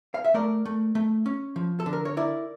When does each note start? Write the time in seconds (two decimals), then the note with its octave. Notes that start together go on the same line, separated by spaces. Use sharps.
0.14 F5
0.24 E5
0.34 A3 A#4 D5
0.65 A3
0.95 A3
1.26 C#4
1.56 F3
1.80 A4
1.86 D3
1.93 A#4
2.05 C#5
2.17 E4 A#4 D5